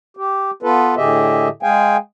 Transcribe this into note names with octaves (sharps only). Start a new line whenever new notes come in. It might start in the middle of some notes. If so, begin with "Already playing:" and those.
G4
B3 F4 A4 B4
A2 D3 G4 G#4 D#5 E5
G#3 G#4 F5 G5 G#5